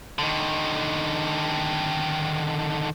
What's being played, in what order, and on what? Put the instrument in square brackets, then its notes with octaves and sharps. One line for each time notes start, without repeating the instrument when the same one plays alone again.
[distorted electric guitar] D3 D#3